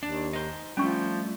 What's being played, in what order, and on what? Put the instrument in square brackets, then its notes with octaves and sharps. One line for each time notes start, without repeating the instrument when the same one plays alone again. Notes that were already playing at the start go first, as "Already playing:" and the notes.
[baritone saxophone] D#2 [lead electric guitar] D4
[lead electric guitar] D#4 C5
[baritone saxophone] F3 [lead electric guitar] G3 A3 [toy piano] C#4 D4 C#6